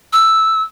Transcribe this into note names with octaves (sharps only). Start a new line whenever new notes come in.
E6